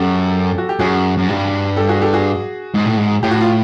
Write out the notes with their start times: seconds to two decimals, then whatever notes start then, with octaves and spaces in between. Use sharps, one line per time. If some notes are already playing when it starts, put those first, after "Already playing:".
Already playing: F#2 G4 A4
0.58 F#4
0.69 G4
0.79 F#2 F#4 G#4
1.18 F#2
1.28 G2
1.77 G4 A4
1.88 F#4 G#4
2.02 G4 A4
2.13 F#4 G#4
2.74 G#2
2.85 A2
2.97 G#2
3.23 A2 G4
3.31 F#4
3.41 F4